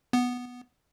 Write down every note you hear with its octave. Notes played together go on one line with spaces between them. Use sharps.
B3